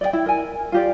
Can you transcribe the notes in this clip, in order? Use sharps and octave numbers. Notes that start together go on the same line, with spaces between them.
D5 D#5 G5
E4
A#4 G#5
F4 G4 D5